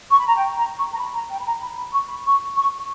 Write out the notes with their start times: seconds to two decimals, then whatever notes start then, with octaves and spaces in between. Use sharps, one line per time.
0.11 C#6
0.19 B5
0.27 A#5
0.36 G5
0.56 A#5
0.78 C#6
0.94 A#5
0.99 B5
1.14 A#5
1.31 G5
1.39 B5
1.46 A#5
1.62 B5
1.78 B5
1.93 C#6
2.09 B5
2.25 C#6
2.56 C#6